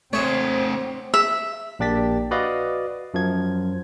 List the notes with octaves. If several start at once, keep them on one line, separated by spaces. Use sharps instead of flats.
A3 C4 G#4 C5 C#5
E5
A#1 A#3 D4 G4 A6 B6
F#4 B4 D5 D#5 F5
F#2 F3 G#6